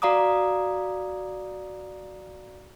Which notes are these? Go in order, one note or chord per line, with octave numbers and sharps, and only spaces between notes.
F#4 D5 F5 A#5 D6 D#6